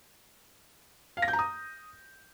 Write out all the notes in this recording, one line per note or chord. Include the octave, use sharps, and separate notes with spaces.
F5
A#6
G6
A#5
D#6